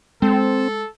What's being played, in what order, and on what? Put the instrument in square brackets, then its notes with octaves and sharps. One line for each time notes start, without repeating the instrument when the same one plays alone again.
[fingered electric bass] G#3 [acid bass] C4 [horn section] A4